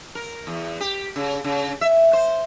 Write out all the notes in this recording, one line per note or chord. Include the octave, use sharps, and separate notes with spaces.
A#4
E2
G4
C#3
C#3
E5
C5